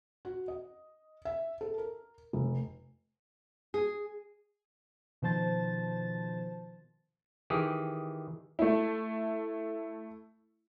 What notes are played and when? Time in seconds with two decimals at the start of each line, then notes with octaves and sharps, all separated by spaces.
0.25 F#4
0.48 D#5
1.25 E5
1.61 A4
1.78 A#4
2.33 F1
3.74 G#4
5.22 B2 D#3 F3 C5 A5 A6
7.50 D#3 E3 G4 G#4
8.59 A3 E4